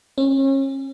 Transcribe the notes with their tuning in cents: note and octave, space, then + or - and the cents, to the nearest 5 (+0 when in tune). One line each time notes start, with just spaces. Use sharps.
C#4 -35